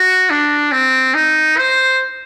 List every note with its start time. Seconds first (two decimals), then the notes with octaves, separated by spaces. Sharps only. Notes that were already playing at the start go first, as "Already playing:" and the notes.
Already playing: F#4
0.30 D4
0.72 C4
1.14 D#4
1.58 C5